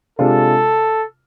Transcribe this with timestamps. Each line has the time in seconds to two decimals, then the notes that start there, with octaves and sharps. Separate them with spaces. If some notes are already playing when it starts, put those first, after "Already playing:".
0.19 C3 G#3 D4 F4 A4